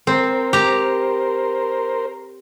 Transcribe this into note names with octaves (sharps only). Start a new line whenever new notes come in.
C4 A#4 C5
G4 A#5